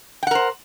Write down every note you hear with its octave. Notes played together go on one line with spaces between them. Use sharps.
A#4 C5 F#5 G5